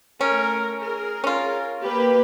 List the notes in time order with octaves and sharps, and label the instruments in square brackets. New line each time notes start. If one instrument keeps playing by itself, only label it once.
[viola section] A3 A#4 [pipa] C#4
[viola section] G#4 A#4
[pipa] C#4 F4
[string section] A#3 B4 [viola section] G4